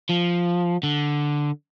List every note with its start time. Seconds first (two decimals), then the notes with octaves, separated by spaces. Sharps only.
0.09 F3
0.83 D3